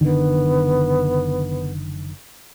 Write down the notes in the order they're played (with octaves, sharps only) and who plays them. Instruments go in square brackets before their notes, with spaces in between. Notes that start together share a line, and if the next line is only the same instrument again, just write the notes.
[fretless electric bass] F#1 D3 D#3 [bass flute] B3